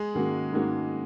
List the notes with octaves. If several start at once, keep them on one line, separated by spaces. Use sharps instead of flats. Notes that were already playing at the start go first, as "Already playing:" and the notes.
Already playing: G#3 G#4
G#2 D#3 A#3 C#4 F#4
G#2 D#3 A#3 C#4 F#4